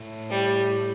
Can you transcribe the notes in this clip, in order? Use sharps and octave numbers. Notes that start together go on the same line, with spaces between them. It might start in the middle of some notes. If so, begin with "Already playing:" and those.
Already playing: A2
G3